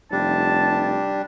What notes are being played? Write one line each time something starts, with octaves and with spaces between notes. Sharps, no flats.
F1 G3 D4 A5